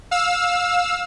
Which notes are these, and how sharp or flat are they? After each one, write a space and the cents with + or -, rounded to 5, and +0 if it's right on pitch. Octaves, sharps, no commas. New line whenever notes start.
F5 +25 E6 +0